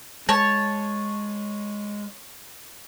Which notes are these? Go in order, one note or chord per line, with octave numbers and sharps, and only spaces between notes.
G#3 C#5 A5